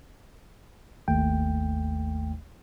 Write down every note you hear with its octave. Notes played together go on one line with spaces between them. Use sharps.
G#1 D#2 A3 G5